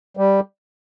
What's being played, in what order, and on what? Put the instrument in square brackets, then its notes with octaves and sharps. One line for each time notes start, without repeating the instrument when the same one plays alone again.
[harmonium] G3